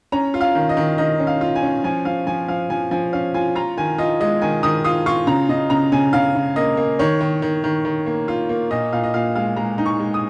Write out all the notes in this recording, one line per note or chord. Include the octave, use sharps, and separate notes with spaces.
C#4 A#5
F4
F5
D#3
D#5
D#3
D#3 D#5
C#4
F5
F4
G#5
C#4
F3 G#5
F3 F5
F3 G#5
F3 F5
F3 G#5
F3 G#5
C#4 F5
F4 G#5
F4 A#5
D#3 G#5
F4 D#5
G#3 D#5
D#3 G#5
D#3 D#6
F4 D#6
F4 C#6
C#3 A#5
C#3 D#5
C#3 A#5
C#3 G#5
C#3 F5
C#3
A#3 D#5
A#3
D#3 C#5
D#3
D#3
D#3
D#3
A#3
F4
A#3
A#2 D#5
A#2 F5
D#5
A#2 F5
G#3 F5
G#3 A#5
D#4
C#6
G#3
D#6